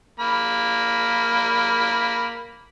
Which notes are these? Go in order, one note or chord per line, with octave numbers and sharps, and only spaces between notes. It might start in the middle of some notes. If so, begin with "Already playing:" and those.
A#3 B5